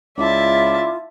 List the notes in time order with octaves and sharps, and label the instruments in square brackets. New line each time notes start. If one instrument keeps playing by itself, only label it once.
[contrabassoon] C#2 [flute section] E4 F4 [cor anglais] D5 [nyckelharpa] E5 A5